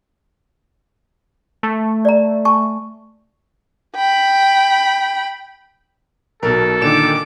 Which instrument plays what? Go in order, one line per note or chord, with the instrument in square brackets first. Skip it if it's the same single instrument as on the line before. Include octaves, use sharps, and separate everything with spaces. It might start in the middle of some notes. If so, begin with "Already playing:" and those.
[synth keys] A3
[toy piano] D5 A#5
G#5 A5 C#6
[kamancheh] G5 B5
[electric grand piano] B1 [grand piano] B2 A#4 [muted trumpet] A4
[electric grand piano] A#2 D3 D#3 [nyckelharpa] D6 [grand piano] E7